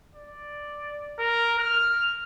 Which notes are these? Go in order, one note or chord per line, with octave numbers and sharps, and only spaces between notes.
D5
A#4
F6